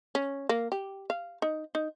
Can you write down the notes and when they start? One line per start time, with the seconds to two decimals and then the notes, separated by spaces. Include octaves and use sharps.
0.15 C#4
0.49 A#3
0.72 G4
1.10 F5
1.42 D#4
1.75 D#4